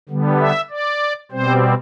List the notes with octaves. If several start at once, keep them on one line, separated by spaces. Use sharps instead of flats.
D3 G3 B3
E5
D5
B2 G3 C4 C5